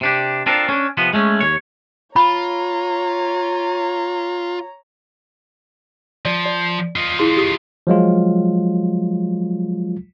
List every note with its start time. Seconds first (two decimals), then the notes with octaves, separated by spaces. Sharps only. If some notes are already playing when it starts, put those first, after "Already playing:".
0.01 C3 D4 G4
0.46 C4 D4 F4 A4 A#4
0.69 C#4 D4
0.97 C3 F3 B3
1.13 G#3 A3 C#4
1.41 D#2 C#5
2.16 F4 C#5 A#5 B5
6.25 F3 D5
6.46 D5
6.96 F4 D#5
7.19 E4 G#4 C6
7.37 G4 D#6
7.87 F3 F#3 G#3 F4